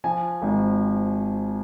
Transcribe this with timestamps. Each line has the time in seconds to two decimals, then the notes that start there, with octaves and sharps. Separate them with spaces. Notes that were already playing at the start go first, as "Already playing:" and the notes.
0.04 F3 G#5
0.42 G#1